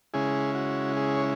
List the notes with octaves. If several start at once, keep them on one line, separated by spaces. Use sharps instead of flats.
C#3 G#3 C#4 E4 G#4
F#4
G#4
C#5